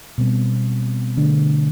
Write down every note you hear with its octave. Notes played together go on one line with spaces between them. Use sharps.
B2 G3 C4
D3 A3 D4